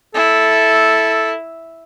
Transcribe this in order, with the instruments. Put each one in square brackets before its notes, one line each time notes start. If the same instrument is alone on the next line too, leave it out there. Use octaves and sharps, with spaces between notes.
[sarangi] E4 [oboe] A4